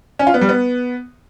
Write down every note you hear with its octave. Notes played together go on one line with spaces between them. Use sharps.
C#4
F4
B3
G3
B3